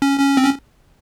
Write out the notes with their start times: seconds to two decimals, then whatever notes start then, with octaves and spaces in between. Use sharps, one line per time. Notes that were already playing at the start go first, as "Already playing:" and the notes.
0.02 C#4
0.19 C#4
0.37 C4
0.45 C#4